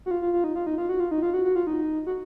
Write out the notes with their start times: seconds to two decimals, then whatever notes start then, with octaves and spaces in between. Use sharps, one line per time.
0.06 F#4
0.11 F4
0.22 F4
0.33 F4
0.44 D#4
0.56 F4
0.67 D#4
0.78 F4
0.89 F#4
1.00 F4
1.11 D#4
1.22 F4
1.34 F#4
1.45 F#4
1.55 F4
1.67 D#4
2.07 F#4